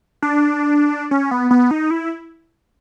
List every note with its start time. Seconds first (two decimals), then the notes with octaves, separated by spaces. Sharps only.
0.22 D4
1.11 C#4
1.31 B3
1.51 B3
1.71 D#4
1.91 E4